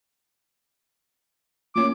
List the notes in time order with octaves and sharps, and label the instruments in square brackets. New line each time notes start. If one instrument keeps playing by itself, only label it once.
[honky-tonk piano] F3 A#3 C#4 [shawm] D6